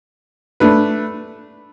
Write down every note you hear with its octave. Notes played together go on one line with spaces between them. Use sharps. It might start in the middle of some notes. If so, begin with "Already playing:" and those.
A3 D4 B4